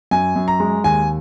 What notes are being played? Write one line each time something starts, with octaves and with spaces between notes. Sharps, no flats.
F#2 G#5
F#2
A#5
G#3
D#2 G#5